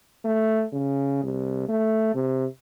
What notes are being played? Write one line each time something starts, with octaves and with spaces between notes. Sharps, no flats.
A3
C#3
C2
A3
C3